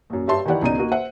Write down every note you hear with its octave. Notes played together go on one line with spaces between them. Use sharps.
A#1 F#2
G2 G4 C#5 E5 A5 C6
D#3 E3 E4 G4 D5 F#5
C#2 B2 D#4 D5 D#7
A#3 D#4 F#4
C5 E5 F#5